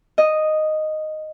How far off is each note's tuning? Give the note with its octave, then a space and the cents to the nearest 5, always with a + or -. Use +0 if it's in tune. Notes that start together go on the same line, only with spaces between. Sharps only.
D#5 -5